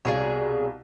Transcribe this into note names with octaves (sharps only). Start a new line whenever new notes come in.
C2 B2 D4 G#4 C#5 F5